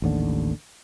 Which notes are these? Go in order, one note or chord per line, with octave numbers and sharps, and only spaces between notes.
A1 D#2 D3